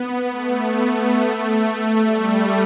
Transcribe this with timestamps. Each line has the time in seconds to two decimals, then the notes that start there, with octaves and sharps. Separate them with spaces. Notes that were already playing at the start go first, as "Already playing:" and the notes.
Already playing: B3
0.28 A3
0.72 A3
1.16 A3
1.60 A3
2.04 G3